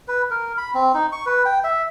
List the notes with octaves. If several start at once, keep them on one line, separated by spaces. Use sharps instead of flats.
B4
A#4
B5
C4
D#4
C#6
B4
G5
E5